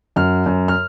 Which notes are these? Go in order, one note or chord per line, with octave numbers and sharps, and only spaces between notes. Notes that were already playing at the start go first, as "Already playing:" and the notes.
F#2 F6
F#2
F6